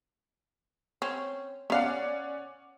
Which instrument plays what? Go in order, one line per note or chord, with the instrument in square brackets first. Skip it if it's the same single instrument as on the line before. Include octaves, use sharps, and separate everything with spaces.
[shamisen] C4 C#4
[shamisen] B3 F5 [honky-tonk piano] C#4 D5 F#5